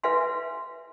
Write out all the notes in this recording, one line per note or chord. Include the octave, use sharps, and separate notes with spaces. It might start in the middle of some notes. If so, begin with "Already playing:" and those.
B4 E5 F5 G#5 C6